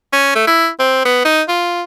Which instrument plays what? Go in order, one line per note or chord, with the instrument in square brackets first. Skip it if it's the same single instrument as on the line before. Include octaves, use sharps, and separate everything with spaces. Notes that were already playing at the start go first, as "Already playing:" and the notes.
[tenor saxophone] C#4
A3
E4
C4
B3
D#4
F4